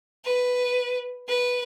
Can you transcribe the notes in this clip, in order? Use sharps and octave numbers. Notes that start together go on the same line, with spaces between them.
B4
B4